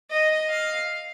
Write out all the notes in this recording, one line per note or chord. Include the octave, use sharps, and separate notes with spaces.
D#5
F5